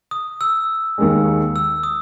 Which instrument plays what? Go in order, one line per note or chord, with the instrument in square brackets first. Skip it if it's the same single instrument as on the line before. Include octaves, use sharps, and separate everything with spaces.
[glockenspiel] D#6
E6
[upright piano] D#2 D#3 G#3
[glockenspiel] E6
D#6